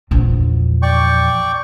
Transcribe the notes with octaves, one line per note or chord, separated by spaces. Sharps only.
A#1 E2
D5 G5 C#6